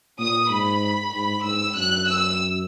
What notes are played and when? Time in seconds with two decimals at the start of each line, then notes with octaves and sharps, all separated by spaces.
0.19 A#2 D#6
0.50 G#2 B5
1.14 G#2 B5
1.45 G#2 E6
1.76 F#2 F#6
2.08 E6